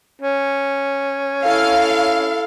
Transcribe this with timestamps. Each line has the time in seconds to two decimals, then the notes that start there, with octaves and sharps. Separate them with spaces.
0.22 C#4
1.44 E4 A4 F5